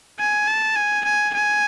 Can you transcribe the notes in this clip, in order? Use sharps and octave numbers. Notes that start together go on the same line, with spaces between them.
G#5
A5
G#5
G#5
G#5